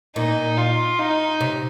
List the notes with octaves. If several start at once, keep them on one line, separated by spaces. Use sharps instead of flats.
A#2 D#4
F4
D#4
C3